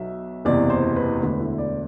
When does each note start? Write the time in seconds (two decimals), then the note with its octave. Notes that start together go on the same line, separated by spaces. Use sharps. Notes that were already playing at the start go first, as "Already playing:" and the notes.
Already playing: B1 B2 F#3 E5
0.45 F#1 E2 C3 E3 D5
0.70 C5
0.96 B4
1.20 E1 D2 D3 B4
1.41 E4
1.58 D5